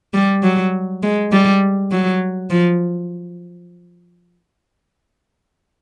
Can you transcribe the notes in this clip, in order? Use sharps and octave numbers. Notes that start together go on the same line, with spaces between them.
G3
F#3
G#3
G3
F#3
F3